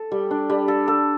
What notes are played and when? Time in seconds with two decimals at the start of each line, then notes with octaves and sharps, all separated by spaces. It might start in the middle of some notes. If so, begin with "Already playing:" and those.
Already playing: A4
0.12 G3
0.31 D4
0.50 G3
0.68 A4
0.88 A4